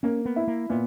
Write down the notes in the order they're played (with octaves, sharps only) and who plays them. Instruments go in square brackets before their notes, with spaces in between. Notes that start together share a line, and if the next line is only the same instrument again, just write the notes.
[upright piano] A#3 [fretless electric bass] C#4
[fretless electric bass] B3
[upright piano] E4
[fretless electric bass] A#3
[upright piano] A#2 [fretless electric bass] B3